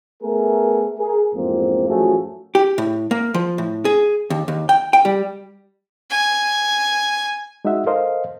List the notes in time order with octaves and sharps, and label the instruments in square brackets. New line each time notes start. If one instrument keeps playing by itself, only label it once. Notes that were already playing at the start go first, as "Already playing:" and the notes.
[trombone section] A3 B3 G#4 A#4
G#4 A#4
A1 F2 G#2 A#3 C4
A1 F#2 F3 A3 F#4 G#4
[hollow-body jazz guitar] G4
A2
A#3
F3
A2
G#4
D#2
D#2
G5
G5
G3
[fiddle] G#5
[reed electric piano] G#3 D#4 F#4 D#5 E5 F#5
A4 A#4 C5 D#5 F5 C6